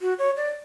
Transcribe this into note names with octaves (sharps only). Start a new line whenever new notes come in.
F#4
C#5
D5